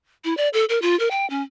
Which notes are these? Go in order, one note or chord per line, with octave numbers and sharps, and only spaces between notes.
E4
D5
A4
A#4
F4
A#4
G5
C#4